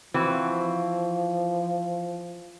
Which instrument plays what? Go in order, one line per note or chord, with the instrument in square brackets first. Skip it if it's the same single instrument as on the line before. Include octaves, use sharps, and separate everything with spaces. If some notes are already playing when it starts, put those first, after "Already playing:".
[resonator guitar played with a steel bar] E3 C4 F#4 [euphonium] F3